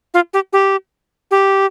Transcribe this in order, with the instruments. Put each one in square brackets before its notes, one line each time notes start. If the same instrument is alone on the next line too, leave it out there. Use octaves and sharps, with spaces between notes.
[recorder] F4
G4
G4
G4